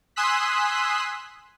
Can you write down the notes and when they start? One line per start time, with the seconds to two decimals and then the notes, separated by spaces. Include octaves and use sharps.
0.16 G#5 C6 D#6 E6 F#6 B6